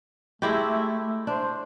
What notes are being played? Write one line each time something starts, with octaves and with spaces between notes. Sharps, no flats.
G#3 A3 E4 G4
D4 C5